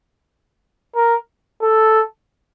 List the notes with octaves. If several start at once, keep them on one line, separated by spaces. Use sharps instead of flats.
A#4
A4